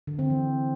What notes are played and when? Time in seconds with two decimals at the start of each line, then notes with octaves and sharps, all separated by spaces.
0.07 D3
0.19 C4
0.30 E3